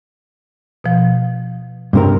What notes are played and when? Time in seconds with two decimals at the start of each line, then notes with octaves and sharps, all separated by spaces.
0.84 B2 F3
1.93 G2 C3 A#4